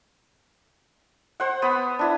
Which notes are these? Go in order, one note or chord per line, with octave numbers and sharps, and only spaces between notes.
C5 F#5
B3 B5
D4 E4